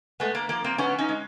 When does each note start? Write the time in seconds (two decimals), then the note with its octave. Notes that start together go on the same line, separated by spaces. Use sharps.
0.20 G#3 A3 B3
0.35 A#3
0.49 F3 A#3
0.64 A#3 C4
0.78 G#3 B3 C#4
0.99 C#4 D#4
1.09 G#3